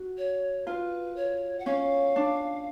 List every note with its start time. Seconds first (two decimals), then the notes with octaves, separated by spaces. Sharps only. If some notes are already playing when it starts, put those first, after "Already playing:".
Already playing: F#4
0.18 C#5
0.67 F4 B4
1.16 C#5
1.59 F#5
1.65 C#4 F5
2.16 D4